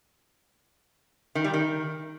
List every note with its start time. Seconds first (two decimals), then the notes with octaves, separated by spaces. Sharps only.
1.35 D#3
1.44 G3
1.54 D#3